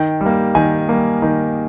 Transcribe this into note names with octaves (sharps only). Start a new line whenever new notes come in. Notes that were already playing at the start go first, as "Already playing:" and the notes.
Already playing: D#3 G5
G3
A#3
D#3 G#5
G3 A#3
D#3